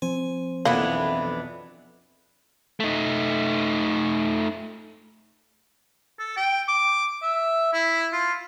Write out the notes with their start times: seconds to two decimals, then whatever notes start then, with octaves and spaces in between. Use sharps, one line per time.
0.02 F3 C4 C5 G#5
0.65 B1 F2 E3 A#3 B3 D4
2.80 A3 D#4
6.19 A4
6.37 G5
6.68 D6
7.22 E5
7.73 E4
8.13 F4